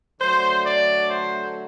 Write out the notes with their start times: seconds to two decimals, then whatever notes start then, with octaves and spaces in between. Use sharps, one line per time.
0.19 D3 F#3 A3 C5
0.64 D5
1.09 C5